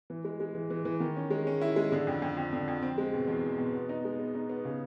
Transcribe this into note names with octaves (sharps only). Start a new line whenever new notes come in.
E3
G#3
G#3
E3
E3
E3
D#3
C#4
G#3
C#4
E4
G#3
D3
F2
F2
F2
D3
F2
C4
G#3
B2
E2
B2
B2
B3
D#4
G#3
B3
D#4
B3
C#3